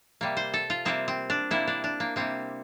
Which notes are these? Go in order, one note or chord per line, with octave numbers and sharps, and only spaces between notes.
C3 G3 A#3
C5
A4
F4
C3 G3 A#3 C4
C4
D4
C3 G3 A#3 E4
D4
D4
A#3
C3 G3 A#3 C4